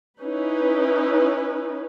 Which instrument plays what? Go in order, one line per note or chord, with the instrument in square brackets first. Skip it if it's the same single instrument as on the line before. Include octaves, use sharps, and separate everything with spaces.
[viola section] C#4 D#4 E4 B4